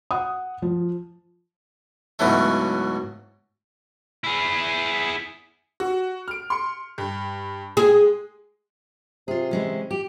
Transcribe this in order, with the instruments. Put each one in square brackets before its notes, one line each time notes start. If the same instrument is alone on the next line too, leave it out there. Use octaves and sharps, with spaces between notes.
[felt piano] F#5 D#6
F3
[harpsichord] C#2 G#2 B2 E3 F#3 A3
[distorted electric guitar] E4 G#4
[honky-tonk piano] F#4
F6 D7
C6 C#7
G2
[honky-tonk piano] G#3 [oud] G#4
[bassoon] C3 [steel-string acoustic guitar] F4 G#4
[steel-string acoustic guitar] E3 G#3 C#4
G4